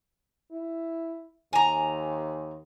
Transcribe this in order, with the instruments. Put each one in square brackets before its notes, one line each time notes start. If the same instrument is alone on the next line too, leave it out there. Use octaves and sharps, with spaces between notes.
[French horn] E4
[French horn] D#2 [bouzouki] G#5 A#5